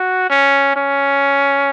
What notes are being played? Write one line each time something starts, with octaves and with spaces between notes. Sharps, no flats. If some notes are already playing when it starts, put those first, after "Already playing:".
Already playing: F#4
C#4
C#4